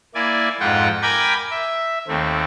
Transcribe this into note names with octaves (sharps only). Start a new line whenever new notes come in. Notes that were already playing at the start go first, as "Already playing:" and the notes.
A#3 E4 D5 G#5
F2 G#2 F4 F#5 G5
A#4 G5 G#5 B5 D6 G#6
E5
D#2 A3 C4